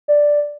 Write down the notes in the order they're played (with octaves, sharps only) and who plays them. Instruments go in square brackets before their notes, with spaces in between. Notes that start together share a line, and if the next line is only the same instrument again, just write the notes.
[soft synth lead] D5